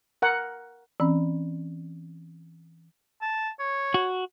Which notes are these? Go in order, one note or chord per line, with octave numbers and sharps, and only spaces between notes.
A#4 F#5
E3 C4 C#4
A5
C#5
F#4